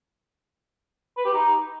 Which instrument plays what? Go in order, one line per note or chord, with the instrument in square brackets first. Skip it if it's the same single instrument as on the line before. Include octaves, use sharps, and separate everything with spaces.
[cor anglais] B4
G4
D#4